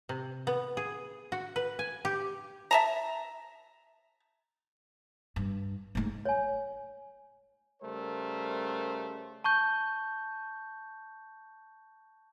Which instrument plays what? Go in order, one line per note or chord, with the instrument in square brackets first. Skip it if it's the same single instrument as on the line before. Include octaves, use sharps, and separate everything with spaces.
[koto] C3
B3
G#4
F#4
B4
G#5
G4
[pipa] E5 A5 A#5
[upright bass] G2
G#2 A3
[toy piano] C#5 G#5
[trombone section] C#3 G3 A3 A#4 C5
[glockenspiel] A5 C#6 G6